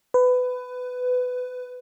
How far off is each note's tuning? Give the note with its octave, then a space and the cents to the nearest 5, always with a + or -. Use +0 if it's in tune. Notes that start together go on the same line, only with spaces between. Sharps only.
B4 +20